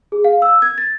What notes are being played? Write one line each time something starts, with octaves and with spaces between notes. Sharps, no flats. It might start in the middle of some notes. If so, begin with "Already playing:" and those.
G#4
F5
E6
G#6
A6